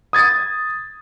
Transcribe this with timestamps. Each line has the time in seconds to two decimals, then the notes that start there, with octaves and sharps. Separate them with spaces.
0.13 D#6 G#6 A6